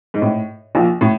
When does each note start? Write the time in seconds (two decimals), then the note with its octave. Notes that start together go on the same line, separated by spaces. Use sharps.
0.14 G#2
0.22 A2
0.75 A#1 A#2
1.01 A2